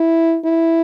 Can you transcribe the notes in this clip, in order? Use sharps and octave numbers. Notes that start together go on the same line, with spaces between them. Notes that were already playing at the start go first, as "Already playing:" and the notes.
Already playing: E4
E4